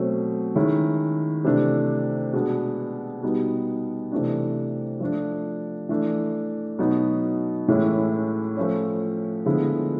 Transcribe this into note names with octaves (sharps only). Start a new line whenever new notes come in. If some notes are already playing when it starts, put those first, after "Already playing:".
Already playing: B2 F#3 A3 C4
D#3 G#3 C#4 E4
C3 E3 A3 D4
B2 G#3 B3 D4
B2 G3 B3 D#4
C3 E3 A3 D4
F3 A3 D4
E3 A3 D4
B2 F#3 B3 D#4
A2 E3 G#3 C#4 E4
F3 A3 C#4
D3 F3 G#3 B3 E4